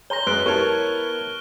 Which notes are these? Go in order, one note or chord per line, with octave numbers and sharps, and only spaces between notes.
C#5 A#5 C6 A#6 G7
F#2 G#3 B4 F#6 D7
B3 E4 G4 A#4 C#5 A5 C#6 F6